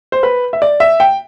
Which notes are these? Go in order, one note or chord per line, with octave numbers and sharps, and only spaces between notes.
C5
B4
E5
D5
E5
G5